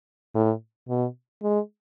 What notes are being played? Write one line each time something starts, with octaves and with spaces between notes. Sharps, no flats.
A2
B2
G#3